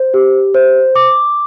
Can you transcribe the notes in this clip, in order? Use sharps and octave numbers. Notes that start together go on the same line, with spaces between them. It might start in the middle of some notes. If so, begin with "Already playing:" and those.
Already playing: C5
G4
C5
D6